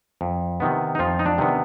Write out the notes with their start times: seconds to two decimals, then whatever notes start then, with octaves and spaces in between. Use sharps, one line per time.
0.21 F2
0.60 C3 D#3 B3
0.95 D#4
0.99 F2 F3 F4
1.19 D#4
1.26 D4
1.38 C3 D#3 B3